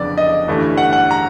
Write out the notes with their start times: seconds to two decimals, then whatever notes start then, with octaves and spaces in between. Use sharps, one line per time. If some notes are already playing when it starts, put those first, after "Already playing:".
Already playing: F#1 F2 D3 B3 D5
0.18 D#5
0.47 G1 G2 E3 A3
0.77 F#5
0.93 F#5
1.11 A#5